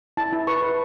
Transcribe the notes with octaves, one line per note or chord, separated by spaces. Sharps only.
E4 A5
E4
B4 C#6
B4